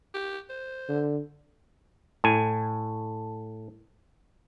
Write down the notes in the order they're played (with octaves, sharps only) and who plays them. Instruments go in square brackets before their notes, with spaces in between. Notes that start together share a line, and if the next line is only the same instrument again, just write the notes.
[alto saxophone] G4
C5
[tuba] D3
[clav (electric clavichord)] A2 G#5